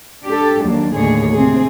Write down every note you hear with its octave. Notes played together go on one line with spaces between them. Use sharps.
D4 G4 A4
D#2 F#3 A#3 D4
D#2 A2 D3 G#4 C#5
C3 C4 G#4